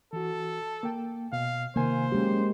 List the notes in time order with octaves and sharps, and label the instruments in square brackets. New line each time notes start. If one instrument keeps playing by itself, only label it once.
[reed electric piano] E3 F#4 [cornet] A4
[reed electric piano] A#3 G5
[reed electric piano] B2 [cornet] F5
[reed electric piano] C3 D#3 G#5 [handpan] A#3 [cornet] C5
[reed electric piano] F#3 C#4 [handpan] G#3 G4